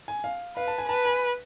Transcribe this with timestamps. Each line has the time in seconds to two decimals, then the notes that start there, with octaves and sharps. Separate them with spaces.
0.08 G#5
0.24 F5
0.56 B4 F5
0.68 A5
0.78 G#5
0.89 B4 A5
1.05 G#5